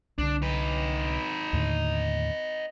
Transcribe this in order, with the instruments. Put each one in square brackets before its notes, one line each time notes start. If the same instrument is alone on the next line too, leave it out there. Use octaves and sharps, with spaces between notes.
[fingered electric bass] C2 D3 [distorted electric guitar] D4
[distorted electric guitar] D#4 B4
[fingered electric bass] D#2 A2 D3